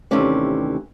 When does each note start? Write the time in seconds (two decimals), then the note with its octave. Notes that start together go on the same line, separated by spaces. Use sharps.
0.11 D#2 C3 E3 A3 C#4 D5